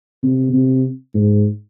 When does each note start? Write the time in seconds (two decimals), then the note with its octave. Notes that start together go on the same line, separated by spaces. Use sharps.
0.23 C3
0.53 C3
1.14 G#2